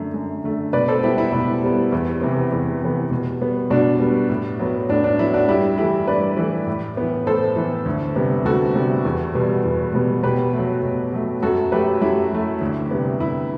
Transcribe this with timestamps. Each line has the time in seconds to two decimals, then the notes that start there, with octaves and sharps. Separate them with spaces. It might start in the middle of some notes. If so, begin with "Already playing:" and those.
Already playing: F#2 D3 A3
0.14 F#2
0.44 D3 A3
0.73 B2 B4 D5
0.88 A4 C5
1.03 G3 B3 E4 G4
1.18 E4
1.32 B2 E4
1.63 G3 B3
1.92 E2
2.21 C3 E3 B3
2.52 E2
2.81 C3 E3 B3
3.11 B2
3.41 G3 B3
3.70 B2 D4 F#4
4.00 G3 B3
4.29 A2
4.59 F#3 B3
4.89 A2 D4
5.04 D4
5.19 F#3 B3 E4
5.34 D4 F#4
5.48 G2 E4 G4
5.78 E3 A3 E4 G4
6.07 G2 B4 D5
6.37 E3 A3
6.67 A2
6.97 E3 B3
7.26 A2 A4 C5
7.56 E3 B3
7.86 D2
8.16 C3 G3 B3
8.45 D2 F#4 A4
8.75 C3 G3 B3
9.05 E2
9.35 B2 G3 B3
9.64 E2
9.94 B2 G3 B3
10.23 B2 G4 B4
10.53 F#3 A3
10.83 B2
11.12 F#3 A3
11.42 F#2 F#4 A4
11.72 F#3 A3 G4 B4
12.02 F#2 E4 G4
12.32 F#3 A3
12.61 D2
12.91 C3 G3 B3
13.20 D2 E4